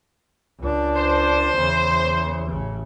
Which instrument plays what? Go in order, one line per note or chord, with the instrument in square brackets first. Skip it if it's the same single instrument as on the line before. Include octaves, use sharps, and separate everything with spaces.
[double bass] C#2 D4
[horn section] C5
[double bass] E2 C#3
A1 C#3